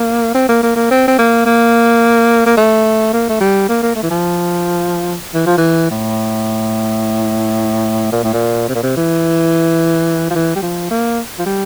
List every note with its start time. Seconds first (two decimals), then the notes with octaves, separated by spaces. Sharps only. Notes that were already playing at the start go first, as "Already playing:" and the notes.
Already playing: A#3
0.34 C4
0.49 A#3
0.63 A#3
0.76 A#3
0.91 C4
1.08 C4
1.19 A#3
1.46 A#3
2.46 A#3
2.57 A3
3.13 A#3
3.29 A3
3.41 G3
3.69 A#3
3.83 A#3
3.96 A3
4.03 E3
4.11 F3
5.34 E3
5.47 F3
5.58 E3
5.91 A2
8.12 A#2
8.24 A2
8.33 A#2
8.68 C3
8.75 A#2
8.83 C3
8.97 E3
10.31 F3
10.35 E3
10.56 G3
10.62 F3
10.91 A#3
11.39 F3
11.46 G3